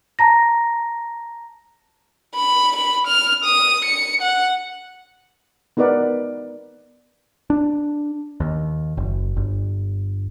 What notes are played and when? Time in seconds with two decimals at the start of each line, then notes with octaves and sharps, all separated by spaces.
0.19 A5 A#5 A#6
2.35 B5
2.76 B5
3.07 F6
3.44 D#6
3.85 C#7
4.22 F#5
5.77 B3 D#4 A#4 B4 D5 F#5
7.50 D4
8.40 D#2
8.97 F#1
9.37 G1